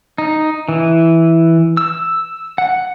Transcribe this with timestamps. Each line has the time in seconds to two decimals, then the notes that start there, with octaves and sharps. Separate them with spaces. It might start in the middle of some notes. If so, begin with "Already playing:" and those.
0.18 D#4
0.69 E3
1.77 E6
2.58 F#5